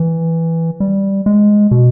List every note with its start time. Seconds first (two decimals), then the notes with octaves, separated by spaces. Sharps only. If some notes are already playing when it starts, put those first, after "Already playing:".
Already playing: E3
0.80 G3
1.26 G#3
1.71 B2